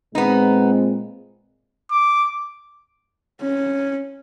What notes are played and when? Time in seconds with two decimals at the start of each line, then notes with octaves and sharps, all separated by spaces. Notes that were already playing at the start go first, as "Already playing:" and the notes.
0.15 A#2 G#3 B3 C4 D#4
1.91 D6
3.41 C#4